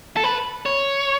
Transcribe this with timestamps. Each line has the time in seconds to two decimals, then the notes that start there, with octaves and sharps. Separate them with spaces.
0.17 A4
0.24 B4
0.66 C#5